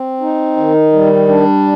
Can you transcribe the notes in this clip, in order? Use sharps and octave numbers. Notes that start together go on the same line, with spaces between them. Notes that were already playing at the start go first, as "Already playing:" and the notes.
Already playing: C4
D#4
D#3
G3
D4